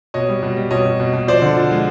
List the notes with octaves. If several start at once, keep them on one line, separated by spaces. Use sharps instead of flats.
B2 C#5 D#5
G3
B2
G3
B2 C#5 D#5
B2
B2
B2
F3 C5 D5
D3
F3
G#3